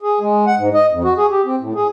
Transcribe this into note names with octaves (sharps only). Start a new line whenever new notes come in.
G#4
G#3
F#5
G#2
D#5
F2
F#4
G#4
G4
C4
A2
G#4